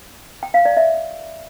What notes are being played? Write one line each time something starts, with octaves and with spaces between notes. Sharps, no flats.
G5
F5
D5
E5